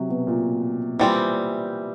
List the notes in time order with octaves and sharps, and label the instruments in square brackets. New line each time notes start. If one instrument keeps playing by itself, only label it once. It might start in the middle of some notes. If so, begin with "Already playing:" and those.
Already playing: [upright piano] C3 F#3
B2
A#2
[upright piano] A#2 [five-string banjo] E3 G3 C4